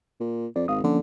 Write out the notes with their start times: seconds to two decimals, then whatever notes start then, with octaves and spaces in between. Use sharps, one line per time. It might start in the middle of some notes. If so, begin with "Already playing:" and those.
0.20 A#2
0.56 F2 D5
0.68 G#1 F5 D#6
0.84 D3 F3 A#3 C#4